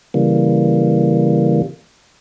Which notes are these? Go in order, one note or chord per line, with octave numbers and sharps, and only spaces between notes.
C#3 E3 G3 A#3